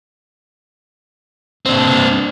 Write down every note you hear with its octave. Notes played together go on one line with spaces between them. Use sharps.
C4 D4